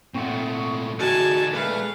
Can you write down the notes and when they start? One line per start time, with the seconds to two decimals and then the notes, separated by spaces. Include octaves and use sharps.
0.14 A#2 A3 C4 F#5 C#6
0.99 D3 A3 D#4 F#4 G#4 G#5 A5 A6
1.53 A#2 G#3 A3 B4 F5 F#6